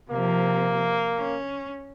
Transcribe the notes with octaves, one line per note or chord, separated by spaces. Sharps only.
C3 F3 A#3
C#4